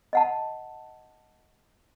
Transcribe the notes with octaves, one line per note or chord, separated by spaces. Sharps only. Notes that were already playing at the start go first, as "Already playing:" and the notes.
D#5 F#5 A5